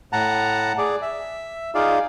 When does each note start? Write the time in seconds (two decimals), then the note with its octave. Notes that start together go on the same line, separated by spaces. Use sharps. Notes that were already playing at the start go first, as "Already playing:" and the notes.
0.13 A2 F#5 A5 A#5
0.78 G#4 D5
1.02 E5
1.75 D#4 F4 G#4 D5 F5